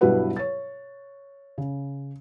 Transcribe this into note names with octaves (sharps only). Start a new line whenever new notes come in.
G2 B2 F#3 E4 B4 F#5
C#5 A6
C#3